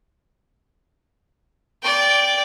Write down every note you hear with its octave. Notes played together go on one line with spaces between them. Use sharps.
D5 G5